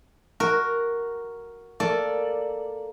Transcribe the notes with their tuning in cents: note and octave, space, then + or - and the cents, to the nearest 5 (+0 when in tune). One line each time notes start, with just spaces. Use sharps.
F#4 +0 A#4 +0
A#3 +0 A4 +0 D5 +0